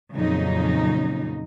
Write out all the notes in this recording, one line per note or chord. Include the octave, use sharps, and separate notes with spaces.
F2 A#2 C#3 F#3 D#4